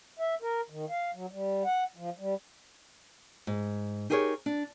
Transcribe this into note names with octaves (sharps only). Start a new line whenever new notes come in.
E5
A#4
D#3
F5
F#3
G3
F#5
F3
G3
G#2
D#4 G4 G#4 A#4 C5 C#5
D4